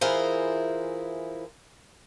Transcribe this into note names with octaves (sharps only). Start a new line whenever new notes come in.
E3 E4 F4 G#4 A#4 C5